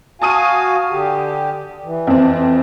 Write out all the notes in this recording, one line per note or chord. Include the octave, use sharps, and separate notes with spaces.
F#4 F5 G#5 A5 D#6 D#7
D3 G4
E3
F2 C4